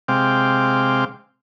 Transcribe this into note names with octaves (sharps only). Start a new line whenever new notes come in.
C3 G#3 C4 F5 G5 D6